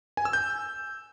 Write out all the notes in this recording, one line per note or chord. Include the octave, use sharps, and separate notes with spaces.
G#5
E6
G6